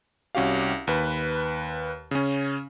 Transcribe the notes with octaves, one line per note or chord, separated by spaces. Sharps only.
C2 C#4 F#4 G4 F5
D#2 B4
C#3 C#4